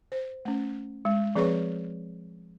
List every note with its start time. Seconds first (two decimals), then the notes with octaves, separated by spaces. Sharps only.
0.12 C5
0.45 A3 C#4
1.05 G#3
1.36 F3 C4 G#4 B4 C#5 C#6